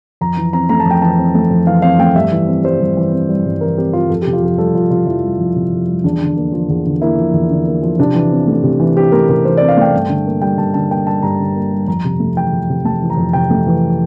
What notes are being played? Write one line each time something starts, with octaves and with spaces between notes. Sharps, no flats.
F2 A#5
E3
C4 A#5
A3 A#5
A5
F2
G5
E3 A5
C4
A3
F2
E3 F5
C4 F5
A3 G5
G2 E5
E3
C4
G3 C5
G2
E3
C4
G3
G2
E3 A#4
C4 G4
G3 F4
F2 A4
C3 G4
F4
F2 G4
G3 A4
F2 F4
C3 F4
F2 E4
G3
F2
C3
F2
G3
E2 D4
D3
A#3
F3
E2
D3
A#3 E4
F3
E2
D3
A#3
F3
C3 D4
E3
C4
A3
C3
E3
C4 G4
A3 A#4
C3 A#4
E3 C5
C4 D5
F5
A3 G5
G2
D3
A#3
G3 G5
G2 A5
D3 A5
A#3 G5
G3 A5
G2 A#5
D3
A#3
G3
F2 A#5
C3
A3
E3 G5
F2
C3
A3 A5
E3
A#5
F2
C3 G5
A3
E3